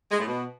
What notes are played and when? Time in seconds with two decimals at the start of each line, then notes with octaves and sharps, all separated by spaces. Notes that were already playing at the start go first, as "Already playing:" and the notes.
0.11 G#3
0.19 A2
0.27 B2